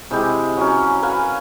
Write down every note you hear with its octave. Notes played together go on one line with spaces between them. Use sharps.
C3 G#3 E4 G4
F#3 C#4
A#4 B4 F5 G#5